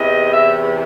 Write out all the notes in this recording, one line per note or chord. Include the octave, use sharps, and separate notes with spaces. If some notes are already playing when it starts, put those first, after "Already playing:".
Already playing: E2 C3 E3 D#5
E5